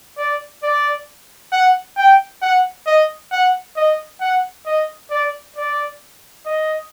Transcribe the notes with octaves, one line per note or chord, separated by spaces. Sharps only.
D5
D5
F#5
G5
F#5
D#5
F#5
D#5
F#5
D#5
D5
D5
D#5